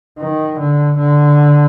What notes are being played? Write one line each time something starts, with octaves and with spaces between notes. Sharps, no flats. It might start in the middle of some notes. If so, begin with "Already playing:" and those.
D#3
D3
D3